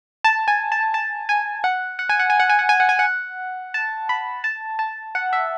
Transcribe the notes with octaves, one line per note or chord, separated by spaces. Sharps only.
A5
G#5
A5
A5
G#5
F#5
F#5
G#5
F#5
G#5
F#5
G#5
F#5
G#5
F#5
G#5
F#5
A5
B5
A5
A5
F#5
E5